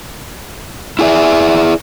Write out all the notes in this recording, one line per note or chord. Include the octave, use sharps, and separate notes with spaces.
E4 F4 G#4 B4 D5 E5